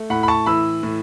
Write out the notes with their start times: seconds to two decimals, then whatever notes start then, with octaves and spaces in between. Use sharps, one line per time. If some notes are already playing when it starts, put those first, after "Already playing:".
Already playing: A3
0.10 A2 F#5 B5
0.23 B5
0.28 A5 C#6
0.46 E3 B5 E6
0.83 A2